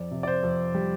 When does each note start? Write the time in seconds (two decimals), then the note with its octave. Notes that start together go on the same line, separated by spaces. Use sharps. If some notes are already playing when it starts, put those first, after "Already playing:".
Already playing: F2 D5
0.11 C3
0.23 D5
0.27 C5
0.43 F2
0.74 G3